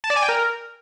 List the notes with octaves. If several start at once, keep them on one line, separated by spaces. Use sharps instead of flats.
A5
D5
G#5
G5
A#4